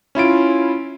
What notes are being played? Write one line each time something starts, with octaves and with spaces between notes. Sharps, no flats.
C#4 E4 F4 D7